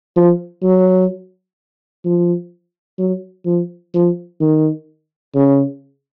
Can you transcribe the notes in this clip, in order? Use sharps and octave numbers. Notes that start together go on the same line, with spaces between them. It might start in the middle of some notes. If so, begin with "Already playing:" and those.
F3
F#3
F3
F#3
F3
F3
D#3
C#3